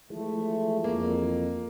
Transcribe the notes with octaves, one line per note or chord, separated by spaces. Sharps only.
E3 F3 G#3 A3
F2 A#3